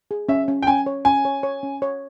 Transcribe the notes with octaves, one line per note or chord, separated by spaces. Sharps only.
G#4
C#4 E5
C#4
G5
C#4 G#5
C#5
C#4 G#5
C#5
C#5
C#4
C#5